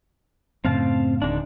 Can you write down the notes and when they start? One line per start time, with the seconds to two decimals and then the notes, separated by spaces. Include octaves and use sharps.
0.65 F#2 A2 C#3 C4 F5 A5
1.22 D1 D3 D#3 G#3 D4